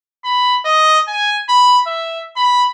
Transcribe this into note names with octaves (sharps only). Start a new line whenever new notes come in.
B5
D#5
G#5
B5
E5
B5